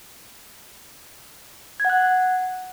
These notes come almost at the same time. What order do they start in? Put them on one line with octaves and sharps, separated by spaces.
G#6 F#5 F#6